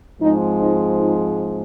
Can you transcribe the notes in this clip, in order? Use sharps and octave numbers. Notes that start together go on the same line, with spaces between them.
G#2 F3 G#3 C4 D#4
D#4 F4
D#4 F4